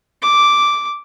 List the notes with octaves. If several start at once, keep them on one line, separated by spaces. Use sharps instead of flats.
D6